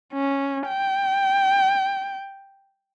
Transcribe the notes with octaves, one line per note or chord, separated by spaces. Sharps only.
C#4
G5